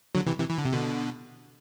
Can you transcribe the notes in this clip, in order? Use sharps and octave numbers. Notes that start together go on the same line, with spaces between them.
D3 F#3
C3 E3
C3 E3
E3
D3
C3
B2 D3